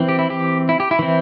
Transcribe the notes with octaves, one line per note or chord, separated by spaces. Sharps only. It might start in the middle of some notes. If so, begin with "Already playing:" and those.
Already playing: E3 C4
G4
E4
G4
E4
G4
E4
E3 C4